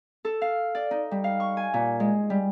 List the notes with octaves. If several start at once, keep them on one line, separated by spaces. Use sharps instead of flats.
A4
F5
D5
D#4
G3
F5
C#6
G#5
A#2
G#3
G3